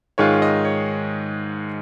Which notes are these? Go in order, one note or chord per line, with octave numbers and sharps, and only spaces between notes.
G#2 D#3 G#3 F4 C#5
D#5
C#5